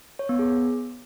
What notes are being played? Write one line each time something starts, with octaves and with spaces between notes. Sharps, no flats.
C#5
B3
G#4